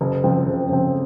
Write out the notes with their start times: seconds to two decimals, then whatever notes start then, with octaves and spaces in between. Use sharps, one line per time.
0.01 F#1
0.24 F2 C#3 F3 C4
0.47 F#1
0.69 F2 C#3 F3 C4